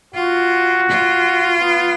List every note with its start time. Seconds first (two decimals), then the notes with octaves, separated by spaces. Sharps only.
0.14 F4 F#4
0.88 F4
1.61 B3